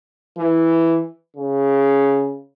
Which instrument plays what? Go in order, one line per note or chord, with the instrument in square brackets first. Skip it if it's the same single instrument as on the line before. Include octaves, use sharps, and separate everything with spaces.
[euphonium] E3
C#3